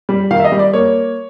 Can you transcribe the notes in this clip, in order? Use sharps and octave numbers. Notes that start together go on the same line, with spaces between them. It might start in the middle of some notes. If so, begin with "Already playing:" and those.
G3
D#3 F5
E5
D#5
G3
D5
A#3 C#5